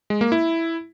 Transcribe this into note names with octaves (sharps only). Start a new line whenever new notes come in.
G#3
A#3
E4